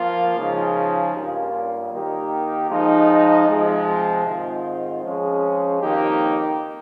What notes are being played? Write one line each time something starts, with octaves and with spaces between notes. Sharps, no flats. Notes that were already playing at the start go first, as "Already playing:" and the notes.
Already playing: F3 A#3 F4
C#3 F3 G#3 D#4
G2 G3 A#3 C#4 F4
D#3 A#3 D#4 G4 A#4
F3 G#3 D#4
C3 F3 G#3
G#2 D#3 G#3 C4 F4
F3 G#3 C#4 G#4
F2 D#3 A#3 D#4 G4